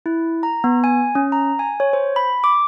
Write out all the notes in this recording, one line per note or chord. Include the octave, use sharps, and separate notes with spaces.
E4
A#5
B3
G#5
C#4
A#5
G#5
C#5
C5
B5
D6